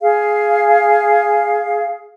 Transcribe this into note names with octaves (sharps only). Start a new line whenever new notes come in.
G#4 F5